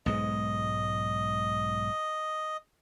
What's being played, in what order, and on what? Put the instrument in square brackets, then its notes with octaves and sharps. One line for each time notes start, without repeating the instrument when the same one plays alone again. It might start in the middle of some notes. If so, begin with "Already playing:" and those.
[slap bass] B1 G#2 G#3 [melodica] D#5